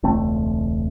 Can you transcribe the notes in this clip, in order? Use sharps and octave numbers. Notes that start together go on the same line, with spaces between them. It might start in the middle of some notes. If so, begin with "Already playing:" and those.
E1 C#2 A3 C4